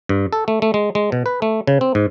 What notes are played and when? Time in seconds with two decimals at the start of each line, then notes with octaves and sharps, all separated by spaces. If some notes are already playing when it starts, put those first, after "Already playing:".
0.09 G2
0.33 A4
0.48 A3
0.62 A3
0.74 G#3
0.95 G#3
1.12 B2
1.26 B4
1.42 A3
1.67 C#3
1.81 C4
1.95 G#2